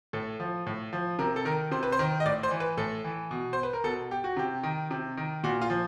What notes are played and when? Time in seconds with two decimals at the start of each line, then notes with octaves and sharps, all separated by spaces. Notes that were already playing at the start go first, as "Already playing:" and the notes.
0.13 A2 A4
0.40 F3
0.66 A2
0.93 F3
1.19 C3 A#4
1.36 A4
1.45 D#3 A#4
1.71 C3 C5
1.83 B4
1.92 C5
1.99 D#3
2.20 D#5
2.25 A2 D5
2.43 C5
2.51 E3
2.60 B4
2.77 A2 A4
3.04 E3
3.31 B2
3.53 C5
3.63 B4
3.73 A#4
3.84 B2 A4
4.11 G4
4.24 F#4
4.37 C3 G4
4.63 D#3
4.91 C3
5.17 D#3
5.44 A#2 F#4
5.62 F4
5.70 F3